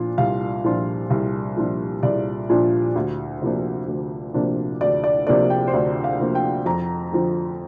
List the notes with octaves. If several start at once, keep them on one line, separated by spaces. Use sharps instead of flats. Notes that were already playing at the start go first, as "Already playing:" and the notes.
Already playing: A#2 F3 D4 F4
C2 F5
A#2 F3 D4 F4
C2
A#2 F3 D4 F4
C2 D5
A#2 F3 D4 F4
D2
C3 F3 A#3 D4
D2
C3 F3 A#3 D4
D2 D5
D5
C3 F3 A#3 D4 D5
G5
C5
D2 D5
F5
C3 F3 A#3 D4
G5
F2 A#5
D3 F3